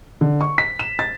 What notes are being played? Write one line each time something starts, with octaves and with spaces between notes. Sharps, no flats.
D3
C#6
B6
E7
A6